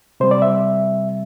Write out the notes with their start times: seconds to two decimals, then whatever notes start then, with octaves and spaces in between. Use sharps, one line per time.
0.20 C3 G3 C5
0.31 D5
0.42 E5